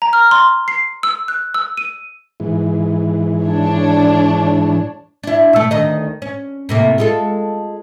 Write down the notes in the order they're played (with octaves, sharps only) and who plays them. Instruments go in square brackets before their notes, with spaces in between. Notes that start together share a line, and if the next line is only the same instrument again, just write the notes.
[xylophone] A#5
F6
C6
C7
E6
F#6
E6
D#7
[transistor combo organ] G#2 E3
[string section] D4 C#5
[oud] D4 E4
B2 A3
D2 D#3 D#5
C#4
A2 C3 A#3
G#3 F4 A4